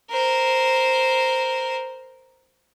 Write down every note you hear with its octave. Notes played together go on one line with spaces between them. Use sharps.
A#4 C5